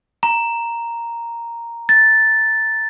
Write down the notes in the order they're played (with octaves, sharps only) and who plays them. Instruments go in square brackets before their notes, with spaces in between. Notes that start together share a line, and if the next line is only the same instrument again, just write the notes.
[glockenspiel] A#5
A6